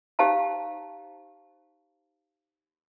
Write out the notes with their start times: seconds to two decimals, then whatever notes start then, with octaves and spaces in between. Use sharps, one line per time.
0.19 D#4 G4 C5 F5 A5 A#5